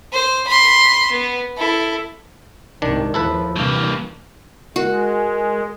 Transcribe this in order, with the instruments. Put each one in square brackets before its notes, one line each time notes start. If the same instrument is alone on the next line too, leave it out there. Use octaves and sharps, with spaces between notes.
[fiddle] C5
B5 C6
B3
E4 A4
[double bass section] C2 G#2 C3 [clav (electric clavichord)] D#3 D4
[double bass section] D#2 F3 [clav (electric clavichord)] E4 A4 B4
[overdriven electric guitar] G2 A#3 [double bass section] C3 E3
[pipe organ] G#3 [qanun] F#4 [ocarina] A#4